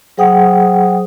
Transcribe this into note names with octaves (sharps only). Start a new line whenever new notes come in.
F#3 G#4 C5 F#5 G5 D#6